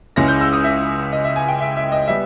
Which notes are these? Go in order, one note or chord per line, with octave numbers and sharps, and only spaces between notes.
C#2 C#3 G#3 C#4 E4 A#6
G6
E6
D#6
E5
D#5
E5
G#5
G5
E5
E5
D#5
G3 B3 E5